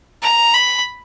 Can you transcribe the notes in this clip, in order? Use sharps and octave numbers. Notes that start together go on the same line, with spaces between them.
A#5
B5